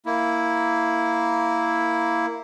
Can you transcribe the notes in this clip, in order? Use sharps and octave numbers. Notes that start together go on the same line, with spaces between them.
A#3 E4